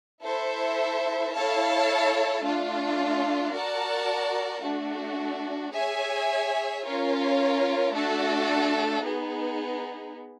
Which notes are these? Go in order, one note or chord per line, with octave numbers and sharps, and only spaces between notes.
E4 A4 C5 E5
E4 A4 C#5 F5 A5
A3 D4 F4
F#4 A#4 D5 F#5 A5
A3 D4 F#4
G#4 C#5 E5 G#5
C#4 F4 A#4 C#5
A3 D4 F#4 A4
B3 D#4 G#4